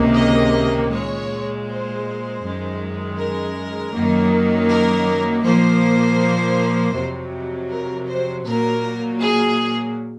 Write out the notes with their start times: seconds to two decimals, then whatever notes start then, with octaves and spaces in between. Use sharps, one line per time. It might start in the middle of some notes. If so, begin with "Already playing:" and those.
Already playing: C#2 C3 D#3 A#3
0.15 D#5
0.91 A#2 G#3 C#5
1.67 C5
2.42 F#2 D#3 G#3
3.18 A#4
3.93 F#2 D#3 F#3 A#3
4.69 A#4
5.44 A#2 F3 A#3 C5
6.94 F2 C3 F#3
7.70 A#4
8.08 C5
8.45 A#2 F#3 A#3 A#4
9.20 G#4